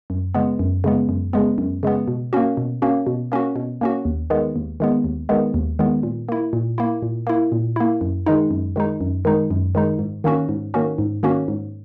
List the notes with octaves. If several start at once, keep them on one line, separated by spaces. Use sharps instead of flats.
F#2
C#3 G#3 B3
F#2
C#3 G#3 B3
F#2
C#3 G#3 B3
F#2
C#3 G#3 B3
B2
A#3 C#4 F#4
B2
A#3 C#4 F#4
B2
A#3 C#4 F#4
B2
A#3 C#4 F#4
D#2
D#3 G#3 B3
D#2
D#3 G#3 B3
D#2
D#3 G#3 B3
D#2
D#3 G#3 B3
A#2
A#3 E4
A#2
A#3 E4
A#2
A#3 E4
A#2
A#3 E4
F#2
D#3 G#3 D#4
F#2
D#3 G#3 D#4
F#2
D#3 G#3 D#4
F#2
D#3 G#3 D#4
G#2
D#3 A#3 C#4 F#4
G#2
D#3 A#3 C#4 F#4
G#2
D#3 A#3 C#4 F#4
G#2